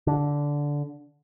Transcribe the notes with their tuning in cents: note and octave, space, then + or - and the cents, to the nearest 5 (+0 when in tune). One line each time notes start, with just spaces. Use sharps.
D3 -10